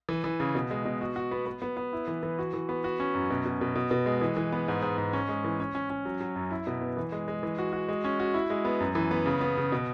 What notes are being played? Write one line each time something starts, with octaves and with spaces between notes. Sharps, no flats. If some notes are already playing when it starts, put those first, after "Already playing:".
E3
E3
C#3
B2
G#3
B2
F#4
F#4
B3
B3
B3
B3
E4
E3
E3
F#4
E3
B3
F#4
C#4
F#2
B2
B2
B2
B2
B2
G#3
E3
E3
B3
G#2
G#2
G#2
C#4
G#3
E3
C#4
C#4
C#4
F#3
F#3
F#2
E4
B2
B3
E3
G#3
G#3
E3
F#4
F#4
G#3
C#4
F#4
E4
G#3
B3
F#2
E3
B3
C#3
B3
C#3
B2